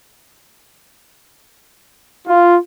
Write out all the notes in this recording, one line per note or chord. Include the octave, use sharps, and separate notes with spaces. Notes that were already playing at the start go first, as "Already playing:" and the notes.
F4